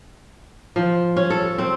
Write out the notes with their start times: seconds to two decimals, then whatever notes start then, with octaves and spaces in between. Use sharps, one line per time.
0.76 F3
1.16 C#4
1.30 A4
1.58 C4